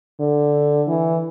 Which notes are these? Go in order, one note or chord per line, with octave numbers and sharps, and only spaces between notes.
D3
E3